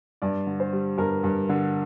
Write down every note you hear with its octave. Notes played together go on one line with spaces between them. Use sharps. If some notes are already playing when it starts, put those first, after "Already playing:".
G2 D5
D3
C5
G3
G2 A#4
G2
D3